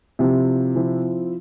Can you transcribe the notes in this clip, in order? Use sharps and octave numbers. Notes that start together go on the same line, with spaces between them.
C3 F3 C4 E4
F3 C4 E4